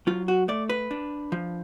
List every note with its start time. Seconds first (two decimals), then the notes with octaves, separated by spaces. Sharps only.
0.07 F#3 F4
0.28 F#4
0.48 A3 D5
0.69 B4
0.91 D4
1.32 F3